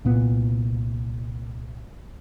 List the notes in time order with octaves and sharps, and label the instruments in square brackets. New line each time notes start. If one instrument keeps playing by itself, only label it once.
[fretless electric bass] C2 A#2 B3